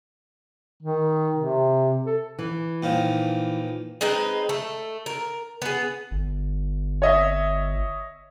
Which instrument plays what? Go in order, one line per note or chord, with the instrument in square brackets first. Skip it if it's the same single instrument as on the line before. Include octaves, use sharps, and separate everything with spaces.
[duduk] D#3
C3
A4
[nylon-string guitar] E3
[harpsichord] A#2 D#3 F3
[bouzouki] G#3 C4 D#4 B4
A3
A#4
B3 G#4
[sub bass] G1
[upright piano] C#5 D#5 E5